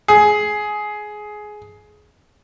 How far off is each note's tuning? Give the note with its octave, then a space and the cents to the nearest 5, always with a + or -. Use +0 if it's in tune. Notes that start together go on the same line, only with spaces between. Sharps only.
G#4 +15